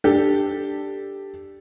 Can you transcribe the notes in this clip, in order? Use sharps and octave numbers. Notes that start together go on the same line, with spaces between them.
D4 G4 A4